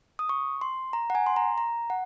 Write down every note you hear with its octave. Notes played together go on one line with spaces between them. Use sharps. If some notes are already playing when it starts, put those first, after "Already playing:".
D#6
C#6
C6
A#5
F#5
G#5
C6
A#5
A#5
F#5